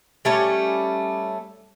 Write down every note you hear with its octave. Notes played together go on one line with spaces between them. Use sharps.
G3 A3 C#4